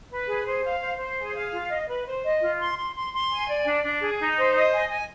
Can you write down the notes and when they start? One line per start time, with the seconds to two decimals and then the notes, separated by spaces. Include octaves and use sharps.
0.10 B4
0.28 G#4
0.45 C5
0.64 F5
0.81 C5
0.98 C5
1.17 G#4
1.35 F5
1.52 F4
1.70 D#5
1.88 B4
2.06 C5
2.23 D#5
2.41 F4
2.60 C6
2.77 C6
2.95 C6
3.13 C6
3.31 G#5
3.48 D5
3.66 D4
3.84 D4
4.01 G#4
4.19 D#4
4.37 C5
4.54 D#5
4.73 G#5
4.90 G#5